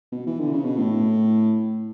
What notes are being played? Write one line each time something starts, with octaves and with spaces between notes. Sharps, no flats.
B2
E3
D3
C#3
B2
A2